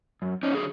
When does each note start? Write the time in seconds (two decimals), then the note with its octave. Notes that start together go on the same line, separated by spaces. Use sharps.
0.22 F#2
0.43 C#4 D#4
0.53 D3 F#3 G#4